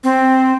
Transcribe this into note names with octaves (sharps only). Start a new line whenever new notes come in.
C4